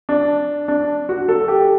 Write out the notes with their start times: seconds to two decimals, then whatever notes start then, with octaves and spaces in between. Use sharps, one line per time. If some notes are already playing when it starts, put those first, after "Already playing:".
0.09 D4
0.68 D4
1.09 F#4
1.29 A4
1.48 G4